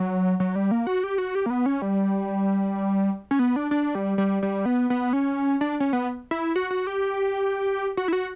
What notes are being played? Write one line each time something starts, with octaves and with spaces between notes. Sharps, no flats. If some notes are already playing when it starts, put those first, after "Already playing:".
Already playing: F#3
F#3
G3
A#3
F#4
G4
F#4
G4
A#3
B3
C#4
G3
C#4
B3
D4
D4
G3
G3
G3
B3
B3
C#4
D4
C#4
B3
E4
F#4
F#4
G4
F#4
E4
F#4